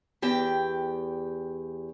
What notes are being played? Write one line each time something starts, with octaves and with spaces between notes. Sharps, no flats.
E2 G4 G5